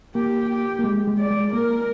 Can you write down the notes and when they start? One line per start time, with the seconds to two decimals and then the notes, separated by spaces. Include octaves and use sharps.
0.15 A#3 G4
0.50 G4
0.79 A#3
0.84 G#3
1.07 G#3
1.18 D5
1.30 G#3
1.53 A#3 A#4